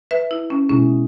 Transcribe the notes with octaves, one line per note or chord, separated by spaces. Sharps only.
B4 E5
E4
C#4
B2 G#3 C#4 E4 G#4